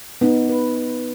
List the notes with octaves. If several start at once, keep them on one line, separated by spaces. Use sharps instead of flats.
B3 D#4
B4